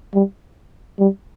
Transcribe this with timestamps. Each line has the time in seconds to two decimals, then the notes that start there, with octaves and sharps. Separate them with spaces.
0.14 G3
0.99 G3